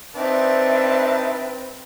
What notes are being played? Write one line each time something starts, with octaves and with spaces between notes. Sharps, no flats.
C4 D4 D#4 B4 E5 A5